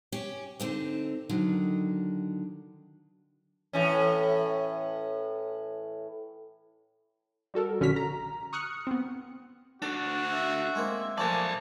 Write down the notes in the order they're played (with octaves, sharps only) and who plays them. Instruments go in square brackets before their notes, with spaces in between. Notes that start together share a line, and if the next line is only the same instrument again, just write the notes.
[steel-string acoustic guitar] C#4 G4
D3 C4 D#4
D3 D#3 F#3
[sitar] A2 E3 C#4
[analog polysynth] G3 F#4 A4 A#4
A#1 D3 C#4 F#4 F6 B6
A#5
C#6 D#6 F6 F#6 C#7
B3 C4
[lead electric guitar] D2 D4 [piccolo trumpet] F#4 [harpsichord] A4
[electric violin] E5
[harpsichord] G#3 A#3 C4
[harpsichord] F3 A3 A#3 [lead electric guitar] C5 D5 [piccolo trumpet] G#5 [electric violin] A5